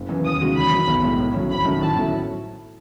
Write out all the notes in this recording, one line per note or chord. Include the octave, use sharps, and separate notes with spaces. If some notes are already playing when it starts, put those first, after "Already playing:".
Already playing: F#1
F#2 E3
D#2 D#6
C#3 G#3 D#4 F#4
E2 B5
D#3 F#3
B1
A2 G#3
A2
F#3 C#4
G#1 B5
F#2 D#3 F#3 A3
A2 A5
F#3 C#4 E4 A4